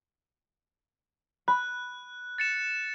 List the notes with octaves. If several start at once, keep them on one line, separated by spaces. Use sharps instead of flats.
B5 F#6
A6 C#7 E7